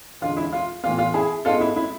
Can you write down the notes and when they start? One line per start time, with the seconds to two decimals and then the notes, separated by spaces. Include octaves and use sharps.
0.21 E2 D3 G#3 F4
0.37 E4
0.53 F4
0.83 A2 E3 B3 F4
0.98 F4
1.14 E4 G#4
1.45 G#2 G#3 B3 F4 A4
1.61 E4
1.76 E4